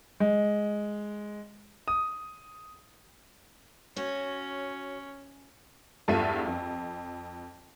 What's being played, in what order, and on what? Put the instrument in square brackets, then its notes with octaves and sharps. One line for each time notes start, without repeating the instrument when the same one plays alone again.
[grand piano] G#3
D#6
[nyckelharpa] C#4 [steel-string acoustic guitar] F#4 C#5
[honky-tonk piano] E2 G2 F4 A4 E5 D#7
F2